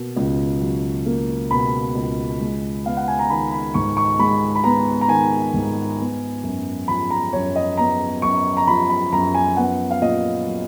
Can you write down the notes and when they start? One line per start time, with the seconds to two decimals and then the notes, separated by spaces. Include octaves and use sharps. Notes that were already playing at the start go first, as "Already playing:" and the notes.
Already playing: B2 A#3
0.16 C#2
0.61 F#3
1.06 A#3
1.51 B2 B5
1.95 C#2
2.40 G#3
2.84 B3 F5
2.97 F#5
3.08 G#5
3.19 A#5
3.30 D#3 B5
3.52 B5
3.74 G#2 C#6
3.97 C#6
4.19 G#3 B5
4.56 B5
4.64 B3 A#5
5.01 A#5
5.08 D#3 G#5
5.54 G#2
5.99 B3
6.43 F#2
6.88 F3 B5
7.10 A#5
7.33 F#2 C#5
7.56 D#5
7.77 B3 A#5
8.22 F#2 C#6
8.57 A#5
8.67 F3 B5
8.90 B5
9.12 F#2 A#5
9.34 G#5
9.57 B3 F#5
9.90 F5
10.01 A#2 D#5
10.47 F#3